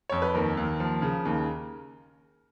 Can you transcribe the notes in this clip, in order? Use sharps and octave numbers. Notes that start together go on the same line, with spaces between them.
F2 C#5
B4
D#2 A#4
D#2
F3
C#3
D#2